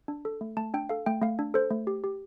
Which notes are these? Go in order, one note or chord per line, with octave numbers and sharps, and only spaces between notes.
D4
A4
A3
A3 A5
D4 G5
A4 F5
A3 G5
A3 F5
D4
A4 C5
A3
G4
G4